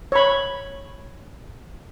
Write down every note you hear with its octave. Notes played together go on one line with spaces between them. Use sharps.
C#5 B5